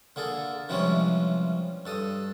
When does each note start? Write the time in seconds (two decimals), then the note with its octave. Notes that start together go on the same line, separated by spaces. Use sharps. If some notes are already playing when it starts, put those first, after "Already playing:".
0.16 D3 A#3 G#4 A4
0.69 C3 E3 F3 G3 G#3 C#4
1.86 G2 A4 D#6